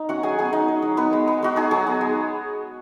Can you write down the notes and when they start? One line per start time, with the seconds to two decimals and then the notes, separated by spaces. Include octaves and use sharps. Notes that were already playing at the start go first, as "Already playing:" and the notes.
Already playing: D#4
0.09 C#4 F#4 F#5
0.23 F#3 G#4 G#5
0.39 B3 G#4 G#5
0.53 F#3 D#4 D#5
0.68 D#4
0.82 F#3
0.97 B3 D#4 B4
1.13 G#3
1.27 B3
1.42 G#3 F#4
1.56 D#4 G#4
1.71 F#3 G#4
1.87 B3
2.01 G#3